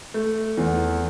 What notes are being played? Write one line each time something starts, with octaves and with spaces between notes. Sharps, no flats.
A3
E2